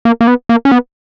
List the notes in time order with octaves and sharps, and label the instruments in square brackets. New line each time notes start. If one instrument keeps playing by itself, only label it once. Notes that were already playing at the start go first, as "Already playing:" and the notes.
[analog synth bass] A#3
A#3
B3
A#3
C#4
B3